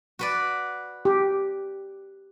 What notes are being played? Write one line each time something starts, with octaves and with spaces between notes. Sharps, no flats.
F#4 B4 D5
G4